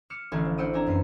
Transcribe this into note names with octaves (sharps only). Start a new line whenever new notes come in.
D6 F6 C#7 E7
A1 D3 G#4 A4 F5 B5
F3
D4 C5 F#5 E6 D7 D#7
C4 D4 G#5 A#5
F#2 B3 B4 C7